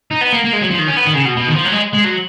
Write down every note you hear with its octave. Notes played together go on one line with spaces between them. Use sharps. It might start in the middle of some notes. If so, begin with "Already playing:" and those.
D#4
B3
A#3
A#3
G#3
F#3
F3
D#3
C#4
B3
D#3
C#3
B2
B2
D#3
F3
F#3
G#3
G#3
F#3